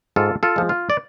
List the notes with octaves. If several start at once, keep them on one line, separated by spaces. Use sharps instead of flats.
G#2 F4 A4
F4 A4
F3 G#3
F4
D5